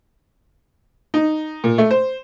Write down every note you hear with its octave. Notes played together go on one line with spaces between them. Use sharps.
D#4
A#2
A3
C5